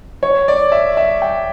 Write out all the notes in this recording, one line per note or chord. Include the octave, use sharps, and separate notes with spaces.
C#5
D5
E5
E5
G5